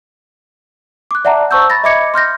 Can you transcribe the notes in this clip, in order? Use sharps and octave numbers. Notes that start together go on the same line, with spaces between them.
D6 F#6
D5 E5 F#5 A5 A#5
C5 A5 C#6 E6 G6
B5 A6 A#6
D#5 E5 B5 D6 G#6 C#7
C6 F6 G6 A#6